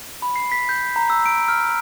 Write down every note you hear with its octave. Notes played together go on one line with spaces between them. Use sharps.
B5
C7
B6
G6
A#5
E6
D7
F6